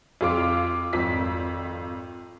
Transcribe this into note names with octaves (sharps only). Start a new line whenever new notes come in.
F2 F4 D6
G#1 F2 B6